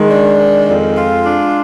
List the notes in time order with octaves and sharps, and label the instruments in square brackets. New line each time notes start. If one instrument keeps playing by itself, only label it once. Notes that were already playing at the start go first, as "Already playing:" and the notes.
Already playing: [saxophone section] D#3 [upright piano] G#3
[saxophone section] D4
D#3
F2
F4
D4